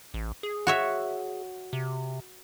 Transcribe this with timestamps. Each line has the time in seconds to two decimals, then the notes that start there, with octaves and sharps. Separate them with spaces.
0.14 A1
0.43 G#4
0.67 F#4 C#5 E5
1.73 C3